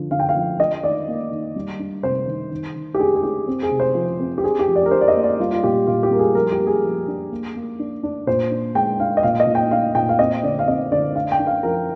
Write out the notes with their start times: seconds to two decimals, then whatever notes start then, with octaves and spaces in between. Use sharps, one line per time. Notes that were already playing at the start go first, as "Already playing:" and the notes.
Already playing: D3 F3
0.11 D3 F5
0.19 G5
0.29 F5
0.36 F3
0.59 D4 D#5
0.83 D#3 D5
1.08 A#3
1.31 D#3
1.56 G3
1.80 D4
2.03 C3 C5
2.27 D#3
2.51 D#3
2.76 D#3
2.94 G4
2.99 D4 G#4
3.15 G#4
3.23 D4 G4
3.47 C4
3.63 G#4
3.71 C3
3.80 C5
3.95 F3
4.20 C4
4.38 G4
4.43 D4 G#4
4.59 G4
4.68 F3
4.76 D5
4.86 A#4
4.91 D4 C5
5.01 D5
5.08 D#5
5.15 A#3
5.23 D5
5.40 G3 F4
5.52 F4
5.63 A#2 G4
5.87 A#2 F4
6.03 G4
6.11 G3 A#4
6.19 G#4
6.35 F3 A#4
6.51 G4
6.59 A#3
6.67 G#4
6.84 F3
7.08 D4
7.31 A#3
7.56 A#3
7.79 D4
8.03 D4
8.27 A#2 C5
8.51 D4
8.75 G#3 G5
9.00 D4 F5
9.17 D#5
9.23 A#2 F5
9.40 D#5
9.47 A#2
9.55 G5
9.71 D4 F5
9.95 A#2 G5
10.09 F5
10.19 C4 D#5
10.43 D3 D5
10.59 F5
10.67 C4 D#5
10.92 D3 D5
11.15 D4 F5
11.32 G5
11.39 D4
11.47 F5
11.63 F3 A#4